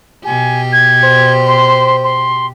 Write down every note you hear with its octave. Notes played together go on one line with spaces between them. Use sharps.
B2 G4 G#5
G#6
C5
C6
C6